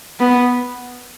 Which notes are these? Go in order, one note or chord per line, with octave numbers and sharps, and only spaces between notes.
B3